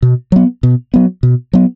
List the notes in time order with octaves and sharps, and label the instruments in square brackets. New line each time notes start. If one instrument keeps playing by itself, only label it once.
[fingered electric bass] B2
F#3 B3
B2
F#3 B3
B2
F#3 B3